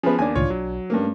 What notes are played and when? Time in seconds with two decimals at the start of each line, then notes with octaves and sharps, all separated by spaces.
0.03 F3 B3 C#4 G#4 B4
0.18 D#2 A#3 D4 G#5
0.36 C#2 A2 D#3 F4 C#5
0.50 B1 F#3
0.90 G2 A3 A#3 C#4